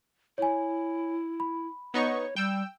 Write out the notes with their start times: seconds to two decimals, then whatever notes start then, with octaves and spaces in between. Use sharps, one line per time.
0.38 E4 C#5 G#5
1.40 B5
1.94 B3 D#4 C#5 C#6
2.36 G3 G5 E6